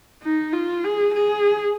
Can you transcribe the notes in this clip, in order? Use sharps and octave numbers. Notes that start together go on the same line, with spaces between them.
D#4
F4
G#4
G#4